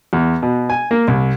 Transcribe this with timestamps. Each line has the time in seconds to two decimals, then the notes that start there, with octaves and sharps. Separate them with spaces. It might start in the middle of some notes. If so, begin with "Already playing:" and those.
0.13 E2
0.43 B2
0.70 G#5
0.91 A#3
1.08 C2